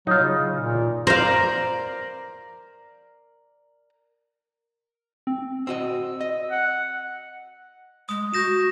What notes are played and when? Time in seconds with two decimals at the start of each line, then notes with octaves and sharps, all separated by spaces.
0.07 F#3 D#4 F4
0.19 C#3
0.53 A#2
1.07 A#4 C5 D5 F5
5.27 C4
5.67 C4 F#4 D#5 E6
6.21 D#5
6.51 F#5
8.09 G#3 D#6
8.34 F#4 G6 A#6 E7